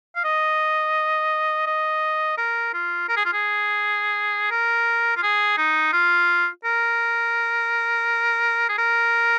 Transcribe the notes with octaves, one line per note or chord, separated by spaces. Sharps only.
F5
D#5
D#5
A#4
F4
A#4
G#4
F4
G#4
A#4
F4
G#4
D#4
F4
A#4
G#4
A#4